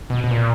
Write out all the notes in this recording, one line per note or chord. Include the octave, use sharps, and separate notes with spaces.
B2
B2
A#2